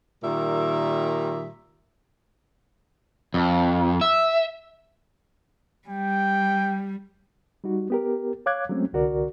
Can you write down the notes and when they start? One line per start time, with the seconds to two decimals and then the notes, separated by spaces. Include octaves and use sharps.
0.23 A#2 D#3 G3 E5
3.34 F2
4.01 E5
5.88 G3 G5
7.64 G3 D#4 F#4
7.90 B3 G4 A#4
8.46 C#5 F5 D6 F#6 G#6
8.69 F#3 G#3 A3 C4 C#4
8.93 C2 D3 F#4 A#4 D5